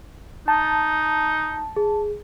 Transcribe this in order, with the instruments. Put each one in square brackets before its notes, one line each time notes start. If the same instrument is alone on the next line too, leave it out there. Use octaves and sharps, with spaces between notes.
[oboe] D#4 [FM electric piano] A5
[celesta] G#4